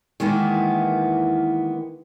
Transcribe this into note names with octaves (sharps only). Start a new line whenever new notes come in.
D#3 E3 G#3 A#3 B3 E4